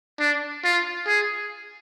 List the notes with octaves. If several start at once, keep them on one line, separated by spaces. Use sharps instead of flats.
D4
F4
G#4